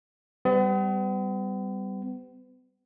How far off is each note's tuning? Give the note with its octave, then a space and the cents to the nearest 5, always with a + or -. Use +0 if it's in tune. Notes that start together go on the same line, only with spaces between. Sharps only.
G3 +0 B3 +45